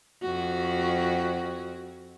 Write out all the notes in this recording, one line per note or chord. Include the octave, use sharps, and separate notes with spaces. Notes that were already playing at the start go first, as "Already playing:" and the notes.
F2 F#4